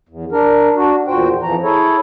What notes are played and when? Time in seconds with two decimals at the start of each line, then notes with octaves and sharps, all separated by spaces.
0.09 E2
0.32 D4 A#4
0.76 D4 F#4
1.08 E2 A#2 F#4 C5 G5
1.43 F2 E3 F3 A#5
1.63 E4 G#4 A4 C#5